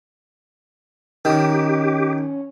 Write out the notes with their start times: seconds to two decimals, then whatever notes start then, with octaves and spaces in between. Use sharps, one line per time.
1.25 D#3 C#4 D#4 G4